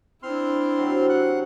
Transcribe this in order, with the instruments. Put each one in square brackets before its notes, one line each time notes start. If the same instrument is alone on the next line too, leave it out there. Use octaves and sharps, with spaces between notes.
[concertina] C4 C6 F6 [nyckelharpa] D4 E4
[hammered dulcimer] C3 F#3
[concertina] F#5 F#6